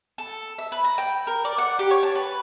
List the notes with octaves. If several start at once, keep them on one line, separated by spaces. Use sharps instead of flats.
A4
E5
B4
A#5
G5
A#4
D5
F#5
G4
C#5
A5
B4